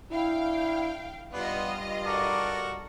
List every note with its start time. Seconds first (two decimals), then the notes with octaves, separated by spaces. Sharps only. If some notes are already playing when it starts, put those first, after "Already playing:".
0.11 D4 E4 F5 G5
1.33 G2 B3 D4 F4 D#5
2.06 F#4 A4 A#4 D5